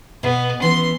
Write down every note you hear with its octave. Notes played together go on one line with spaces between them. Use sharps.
B2 B3
E3 B3 C#4 C6